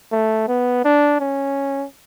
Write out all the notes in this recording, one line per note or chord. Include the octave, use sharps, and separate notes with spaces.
A3
B3
D4
C#4